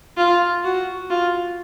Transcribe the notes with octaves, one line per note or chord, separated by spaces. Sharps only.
F4
F#4
F4